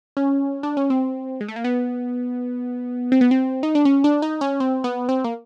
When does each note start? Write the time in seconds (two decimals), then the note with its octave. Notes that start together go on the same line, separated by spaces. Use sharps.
0.17 C#4
0.63 D4
0.77 C#4
0.90 C4
1.41 G#3
1.48 A3
1.56 A#3
1.64 B3
3.12 C4
3.21 B3
3.31 C4
3.63 D#4
3.75 D4
3.85 C#4
4.04 D4
4.22 D#4
4.41 C#4
4.60 C4
4.84 B3
5.09 C4
5.24 A#3